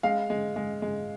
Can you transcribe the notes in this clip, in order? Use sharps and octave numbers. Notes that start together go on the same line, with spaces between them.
G#3 F5
G#3
G#3
G#3